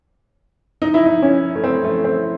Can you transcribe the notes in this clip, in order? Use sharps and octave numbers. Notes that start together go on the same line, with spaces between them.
D#4
E4
D#4
C#4
A3
C4
A3
C4